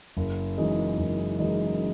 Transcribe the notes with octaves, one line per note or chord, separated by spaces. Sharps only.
F#1
F#2 E3 G#3 D#4
F#1
F#2 E3 G#3 D#4